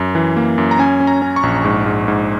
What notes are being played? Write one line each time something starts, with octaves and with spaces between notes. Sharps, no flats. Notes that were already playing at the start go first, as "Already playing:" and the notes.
Already playing: F#2
E3
A#3
F#2
A#5
C#4 G#5
C#4
A#5
C#4
C#6
A#1
G#2
G#2
G#2